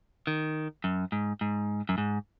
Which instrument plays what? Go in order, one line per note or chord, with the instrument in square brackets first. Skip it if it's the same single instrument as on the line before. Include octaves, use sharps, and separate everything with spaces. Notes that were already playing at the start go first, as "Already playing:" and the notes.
[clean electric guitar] D#3
F#2
G#2
G#2
F#2
G#2